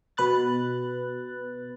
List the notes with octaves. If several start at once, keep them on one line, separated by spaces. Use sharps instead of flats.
B2 B4 F#6 A6